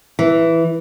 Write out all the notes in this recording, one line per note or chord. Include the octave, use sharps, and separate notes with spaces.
E3